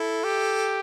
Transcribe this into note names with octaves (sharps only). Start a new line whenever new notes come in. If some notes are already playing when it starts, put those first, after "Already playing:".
Already playing: E4 A4
G4